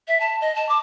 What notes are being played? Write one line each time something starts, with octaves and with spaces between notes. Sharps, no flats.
E5
A5
D#5
A5
D6